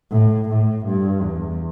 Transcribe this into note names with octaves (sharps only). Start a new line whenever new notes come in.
A2
A2
G2
E2